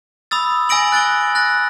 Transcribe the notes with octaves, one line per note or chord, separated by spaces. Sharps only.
B5 D#6 E6 A6
G#5 E6 A#6 D7 F#7
F#6 A6 D7 G7
F#6 A6 A#6